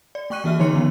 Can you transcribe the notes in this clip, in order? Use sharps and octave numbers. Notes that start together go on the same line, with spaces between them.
D5
A3 G5 C#6 F#6 D#7
E3 A#3 F#4 E5 F6
D3 F3 D#4 C#5 C6 C#7
D#3 B3 C#4